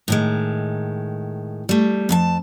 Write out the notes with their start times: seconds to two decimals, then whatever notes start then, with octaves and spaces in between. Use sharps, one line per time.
0.08 A2 D#3 G#3
1.69 G3 A3
2.09 F2 G#5 A5